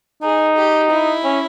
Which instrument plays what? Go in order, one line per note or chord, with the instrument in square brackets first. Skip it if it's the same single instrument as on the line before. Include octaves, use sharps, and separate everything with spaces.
[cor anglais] D#4 [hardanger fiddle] G#4
[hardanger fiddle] G4
E4
[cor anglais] C#4